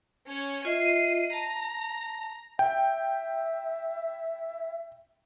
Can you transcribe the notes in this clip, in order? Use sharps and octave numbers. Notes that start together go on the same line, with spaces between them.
C#4 C#5
F4 D#5 E5 C7 D#7
A5 A#5
E5 G5